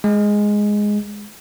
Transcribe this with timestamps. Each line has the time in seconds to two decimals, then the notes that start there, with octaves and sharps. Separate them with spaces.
0.04 G#3